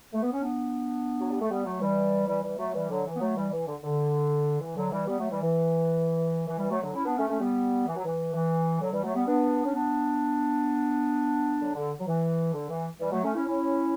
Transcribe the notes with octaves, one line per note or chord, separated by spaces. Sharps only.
A3
B3
C#4
B3 D4
F#3
G3
A3
G3 B3
F#3 A3
E3 G3
E3 G3
E3 G3
F#3 A3
E3 G3
D3 F#3
E3
B3
F#3 A3
E3 G3
E3
D3
D3
E3
D3 F#3
E3 G3
G3 B3
F#3 A3
E3 G3
E3
E3
E3 G3
F#3 A3
D3 F#3
C#4 E4
B3 D4
A3 C#4
A3 C#4
G3 B3
E3
F#3
E3
E3
D3 F#3
E3 G3
F#3 A3
G3 B3
B3 D4
C#4
B3 D4
D3 F#3
D3
F#3
E3
D3
E3
E3 G3
F#3 A3
A3 C#4
C#4 E4
C#4 E4